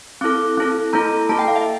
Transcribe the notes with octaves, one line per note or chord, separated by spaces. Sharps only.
C4 E4 A4 D6
C4 E4 A4
A#3 E4 A4 A#5
A#3 E4 A4 A5
G5
F5
E5